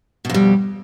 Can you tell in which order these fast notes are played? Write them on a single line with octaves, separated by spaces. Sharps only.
B2 F2 G3